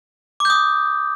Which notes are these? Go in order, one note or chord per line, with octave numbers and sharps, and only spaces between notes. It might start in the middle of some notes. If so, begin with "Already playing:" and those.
D6 D#6 G6